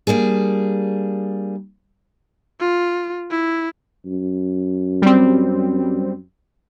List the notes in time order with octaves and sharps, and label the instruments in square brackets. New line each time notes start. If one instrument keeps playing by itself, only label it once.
[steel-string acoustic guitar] G3 A#3 D4 G#4
[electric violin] F4
E4
[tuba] F#2
[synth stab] G3 C4